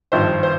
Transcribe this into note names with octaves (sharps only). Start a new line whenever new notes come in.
G#1 G2 F3 C5
C5